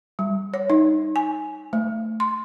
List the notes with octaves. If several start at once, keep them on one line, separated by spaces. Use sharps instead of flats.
G3
C#5
D#4
G#5
A3
C6